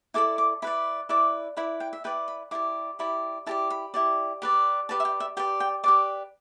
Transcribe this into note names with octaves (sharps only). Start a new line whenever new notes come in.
E4 A4 D5 D6
D6
E4 B4 D5 B5
E4 B4 D5 D6
E4 B4 D5 B5
G5
E5
E4 B4 D5 G5
B5
E4 G4 D5 D6
E4 G4 D5 B5
E4 G4 D5 A5
B5
E4 G4 D5
G4 B4 D5
G4 B4 D5 A5
E5
G5
E5
G4 B4 D5 G5
G5
G4 B4 D5 D6